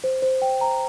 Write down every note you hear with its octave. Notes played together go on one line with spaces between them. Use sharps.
C5
C5
G5
A#5